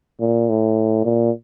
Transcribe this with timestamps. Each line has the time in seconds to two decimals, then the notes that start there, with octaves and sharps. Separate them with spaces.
0.20 A#2
0.49 A2
1.05 A#2